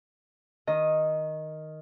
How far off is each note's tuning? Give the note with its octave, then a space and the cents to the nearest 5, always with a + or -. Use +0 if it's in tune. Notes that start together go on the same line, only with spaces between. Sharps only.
D#3 +0 D#5 +0